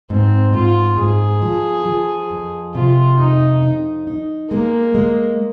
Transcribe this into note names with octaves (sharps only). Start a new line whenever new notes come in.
G#2 C4
G#2 F4
G#2 G#4
F3
F3
F2
C3 F4
F2 D#4
D#4
D#4
G#3 A#3
G#3